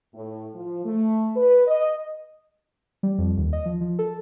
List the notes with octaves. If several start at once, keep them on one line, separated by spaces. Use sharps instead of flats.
A2
F3
A3
B4
D#5
G3
F2
D#2
D#5
F3
F3
A4